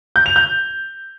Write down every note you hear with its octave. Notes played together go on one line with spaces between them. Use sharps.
G6
F7
G6